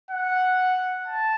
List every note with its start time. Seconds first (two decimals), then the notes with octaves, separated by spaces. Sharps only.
0.11 F#5
1.07 A5